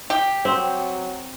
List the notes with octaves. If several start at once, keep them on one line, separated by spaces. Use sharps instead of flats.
G4
F#3 C4